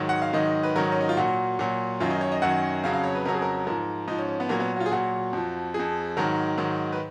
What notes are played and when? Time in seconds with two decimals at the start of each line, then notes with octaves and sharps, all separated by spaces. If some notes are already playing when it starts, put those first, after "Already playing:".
Already playing: G#2 D#3 F#3
0.09 F#5
0.22 F5
0.33 G#2 D#3 F#3 D#5
0.63 B4
0.76 G#2 D#3 F#3 A#4
0.92 C#4
1.01 D#4
1.09 F4
1.17 A#2 F#3 F#4
1.59 A#2 F#3
2.00 F#2 D#3 F#3 F4
2.10 D#4
2.21 C#5
2.32 D#5
2.42 F#2 D#3 F#3 F#5
2.83 F2 C#3 F#3 F5
2.93 F5
3.04 C#5
3.15 B4
3.25 F2 C#3 F#3 A#4
3.34 G#4
3.42 A#4
3.67 G#2 F3 A#4
4.08 G#2 F3 D#4
4.19 C#4
4.29 C#4
4.40 B3
4.49 A#2 F#3 A#3
4.60 B3
4.77 F#4
4.80 F4
4.86 G#4
4.91 A#2 F#3 F#4
5.33 F2 F3
5.74 F2 F3 G#4
6.17 G#2 D#3 F#3 A#4
6.58 G#2 D#3 F#3
6.92 B4